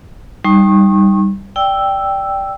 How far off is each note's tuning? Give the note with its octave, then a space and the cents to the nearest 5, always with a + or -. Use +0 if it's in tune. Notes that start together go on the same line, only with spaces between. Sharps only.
G3 +0 D#4 +0 C#6 -35
D5 +0 G5 +0 E6 +0